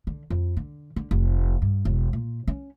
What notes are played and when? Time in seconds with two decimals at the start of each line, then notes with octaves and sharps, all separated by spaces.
0.07 D3
0.30 F2
0.57 D3
0.96 D3
1.11 F1
1.62 G2
1.85 E1
2.13 A#2
2.47 C#4